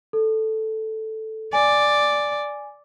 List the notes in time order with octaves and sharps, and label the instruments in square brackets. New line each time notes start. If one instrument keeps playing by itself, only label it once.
[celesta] A4
[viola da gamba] D5 [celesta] G#5